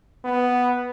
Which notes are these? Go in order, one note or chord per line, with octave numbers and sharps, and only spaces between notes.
B3